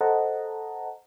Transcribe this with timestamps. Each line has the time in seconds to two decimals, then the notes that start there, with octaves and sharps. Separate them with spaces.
0.01 A4 C5 D#5 F#5 A5 A#5